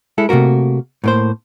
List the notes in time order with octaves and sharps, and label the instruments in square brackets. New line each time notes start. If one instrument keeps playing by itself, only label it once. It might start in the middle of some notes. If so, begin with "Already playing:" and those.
[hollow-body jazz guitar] G#3 E4 A4
C3 A3 A#3 F#4 A#4
A2 A#3 C5